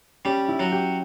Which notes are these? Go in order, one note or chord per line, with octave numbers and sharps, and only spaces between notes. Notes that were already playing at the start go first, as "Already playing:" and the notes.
G3 C#4 G4
E4
F#3 F#4
G4